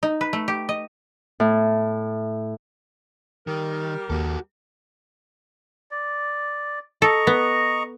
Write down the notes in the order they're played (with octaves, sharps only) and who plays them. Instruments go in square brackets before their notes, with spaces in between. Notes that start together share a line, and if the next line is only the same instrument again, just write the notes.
[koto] D#4
B4
A3
G4
D#5
[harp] A2
[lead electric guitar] D#3 [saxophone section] G3 G4 A#4
[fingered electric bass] D#2 A#3 [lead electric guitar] F#4 A4
[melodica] D5
[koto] A4 [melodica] D#5 A#5 C#6
[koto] B3